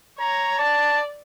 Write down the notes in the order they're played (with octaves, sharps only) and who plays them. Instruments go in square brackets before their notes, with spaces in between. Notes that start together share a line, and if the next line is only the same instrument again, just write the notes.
[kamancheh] C#5 [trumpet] A#5
[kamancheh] D5 [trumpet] A5